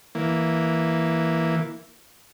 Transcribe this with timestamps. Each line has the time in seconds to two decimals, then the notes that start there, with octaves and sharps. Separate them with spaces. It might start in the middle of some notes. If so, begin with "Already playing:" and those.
0.15 E3 A#3